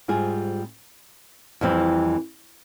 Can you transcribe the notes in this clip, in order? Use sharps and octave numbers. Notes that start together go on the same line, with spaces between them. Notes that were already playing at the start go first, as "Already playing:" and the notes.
G#2 G3 C4 F4 G#4
F2 E3 G3 C4